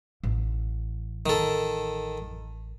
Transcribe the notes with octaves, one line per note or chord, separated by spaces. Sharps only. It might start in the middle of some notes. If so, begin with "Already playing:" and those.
A1
D#3 A4